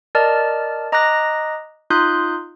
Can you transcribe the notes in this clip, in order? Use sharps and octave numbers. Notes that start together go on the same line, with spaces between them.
A#4 D5 D#5 A5 F6 A6
D#5 A#5 D6 D#6 F#6 A#6
D#4 F4 C6 D#6 F#6 G6